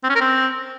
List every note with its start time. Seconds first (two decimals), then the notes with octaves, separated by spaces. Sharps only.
0.04 C4
0.10 C#4
0.15 A#4
0.21 C4